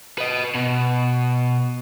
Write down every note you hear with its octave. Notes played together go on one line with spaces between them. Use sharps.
B4 D#5
B2